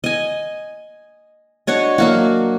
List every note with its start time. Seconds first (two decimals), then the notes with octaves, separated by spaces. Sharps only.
0.04 D#5 G#5
1.67 D4 F#4 C#5 D#5
1.98 F#3 A#3 F#4